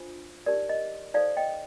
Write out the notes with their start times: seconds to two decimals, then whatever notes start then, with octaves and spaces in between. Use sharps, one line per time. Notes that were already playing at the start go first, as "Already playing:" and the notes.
Already playing: D4 F4 C5
0.46 D#4 G4 A#4 D5
0.69 D#5
1.14 D#4 A4 C5 D5 F5
1.37 D#5 G5